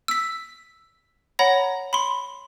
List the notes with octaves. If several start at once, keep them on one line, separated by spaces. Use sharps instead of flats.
E6 B6
C#5 F#5 A#5 B5 A#6
B5 C6